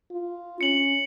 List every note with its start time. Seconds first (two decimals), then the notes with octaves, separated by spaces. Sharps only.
0.11 F4
0.61 C#4 C#7 F#7